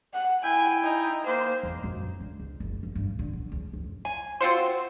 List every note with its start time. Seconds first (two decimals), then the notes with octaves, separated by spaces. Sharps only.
0.14 F#5
0.43 E4 G5 G#5
0.84 D#4
1.26 A#3 C5
1.63 E2
1.84 F#2
2.03 E3
2.21 D3
2.40 C#2
2.60 F#1
2.83 F#1
2.95 G2
3.19 D3
3.33 E2
3.52 C#2
3.73 F2
4.05 G#5
4.41 C4 F4 F#4 C5